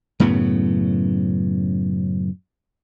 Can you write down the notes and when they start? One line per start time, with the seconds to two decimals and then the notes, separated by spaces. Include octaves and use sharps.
0.20 F#2 A2 C#3 B3